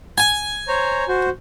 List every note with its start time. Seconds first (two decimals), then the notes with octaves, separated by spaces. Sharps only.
0.18 G#5
0.68 C5 C#5 A#5
1.08 F#4 C5